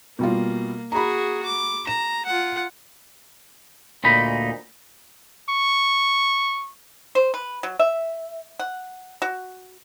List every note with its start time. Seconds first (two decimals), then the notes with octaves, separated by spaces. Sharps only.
0.19 B2 G3 A#3 F4
0.92 F#4 G#4 A#5 B5
1.46 D6
1.87 A#5 E7
2.25 F4 F#5
4.04 D2 A#2 D#4 B5
5.50 C#6
7.15 C5
7.34 B4
7.63 F#3
7.79 E5
8.59 F#5
9.22 F#4